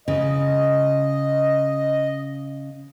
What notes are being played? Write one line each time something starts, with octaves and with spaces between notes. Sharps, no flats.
C#3 D#5